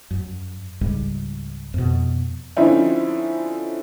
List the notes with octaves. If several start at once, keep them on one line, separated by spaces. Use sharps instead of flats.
F#2
C#2 G#2 G3
F2 B2
D3 F3 C4 C#4 D#4 E4